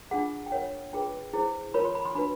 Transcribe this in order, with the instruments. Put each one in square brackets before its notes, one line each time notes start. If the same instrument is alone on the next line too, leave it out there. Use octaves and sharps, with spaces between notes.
[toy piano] D4 F4 G#4 F#5
G5
F4 A#4 C#5 F#5
D4 F4 G#4 B4 G5
E4 G#4 C5
F4 A#4 C#5 B5
C6
B5
C6
D4 F#4 B4 B5